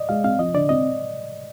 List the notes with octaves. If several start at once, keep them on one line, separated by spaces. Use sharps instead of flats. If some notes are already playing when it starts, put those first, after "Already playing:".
Already playing: D5 D#5
G#3 F5
C4 F5
F3 D#5
D3 D5
C4 D#5